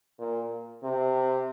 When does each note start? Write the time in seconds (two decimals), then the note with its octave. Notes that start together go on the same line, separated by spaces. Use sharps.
0.19 A#2
0.83 C3